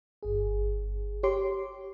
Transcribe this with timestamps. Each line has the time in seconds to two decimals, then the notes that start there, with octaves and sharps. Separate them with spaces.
0.23 G1 G#4
1.23 G4 C#5 C6 D6